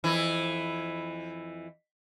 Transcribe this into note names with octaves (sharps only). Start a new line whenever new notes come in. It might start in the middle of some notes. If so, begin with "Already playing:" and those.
F2 E3 E4